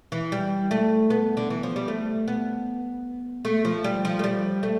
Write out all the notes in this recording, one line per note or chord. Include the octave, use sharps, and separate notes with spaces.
E3
G3
A3
B3
D3
E3
F3
G3
A3
B3
A3
F3
G3
F3
A3
G3
A3